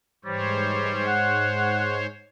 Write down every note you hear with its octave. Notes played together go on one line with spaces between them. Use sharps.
G#2 E3 G3 C5 C#5
F#5